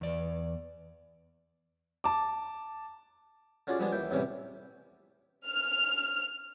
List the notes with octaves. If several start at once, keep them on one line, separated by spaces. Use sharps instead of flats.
E2 D5
A5 D6
D3 C#4 F4 F#4 G#4 D5
F3 G3 G#3 B3 D4 G#4
D#2 E3 G5
E2 A2 C3 E3 G3 C#4
F6